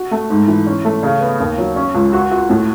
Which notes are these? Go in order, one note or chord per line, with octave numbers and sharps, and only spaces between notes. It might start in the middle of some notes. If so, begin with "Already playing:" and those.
Already playing: F#4
A3
G#2
E3
C#4
A3
C#3
B3
D#2
F#3
C#4
C#2
F#4
F#4
A2